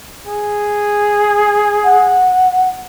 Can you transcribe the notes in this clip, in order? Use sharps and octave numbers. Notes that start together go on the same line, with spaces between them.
G#4
F#5